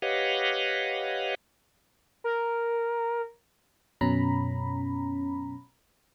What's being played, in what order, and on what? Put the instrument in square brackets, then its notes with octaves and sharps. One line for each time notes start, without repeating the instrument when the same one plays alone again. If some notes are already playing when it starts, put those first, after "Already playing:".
[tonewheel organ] G4 B4 C#5 D#5 F5 F#5
[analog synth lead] A#4
[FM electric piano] F#2 B2 C#4 A#5 B5